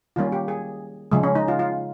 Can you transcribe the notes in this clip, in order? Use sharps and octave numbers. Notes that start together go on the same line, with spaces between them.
D#3 G3 A#3 C#4 F4
G4
G#4
C#3 F3 G#3
C#4
D#4
F4
F4